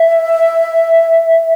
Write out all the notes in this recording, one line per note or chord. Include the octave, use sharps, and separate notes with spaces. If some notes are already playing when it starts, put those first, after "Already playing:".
Already playing: E5